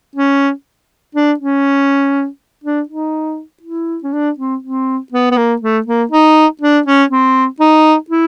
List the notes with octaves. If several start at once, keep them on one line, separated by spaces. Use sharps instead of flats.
C#4
D4
C#4
D4
D#4
E4
C#4
D4
C4
C4
B3
B3
A#3
A3
A#3
D#4
D4
C#4
C4
D#4
E4